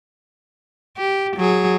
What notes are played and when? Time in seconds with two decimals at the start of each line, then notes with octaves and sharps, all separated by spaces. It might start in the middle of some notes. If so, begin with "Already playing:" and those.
0.97 G4
1.37 F#3 G#4